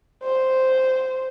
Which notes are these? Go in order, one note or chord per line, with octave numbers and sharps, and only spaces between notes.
C5